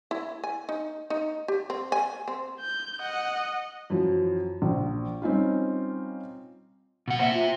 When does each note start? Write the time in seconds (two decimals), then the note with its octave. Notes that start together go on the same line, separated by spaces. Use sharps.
0.11 E4
0.44 G#5
0.69 D#4
1.10 D#4
1.48 G4
1.70 C4
1.92 G#5
2.28 C4
2.60 G6
3.02 D#5 F#5
3.90 F#2 E3 F3
4.62 A#1 F4
5.22 G3 C4 C#4 D#4 F4
7.08 B2 F#5
7.19 A#3 C5 D#5 E5
7.34 F4